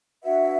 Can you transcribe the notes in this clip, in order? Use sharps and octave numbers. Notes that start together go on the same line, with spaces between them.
D4 F#4 B4 E5 F#5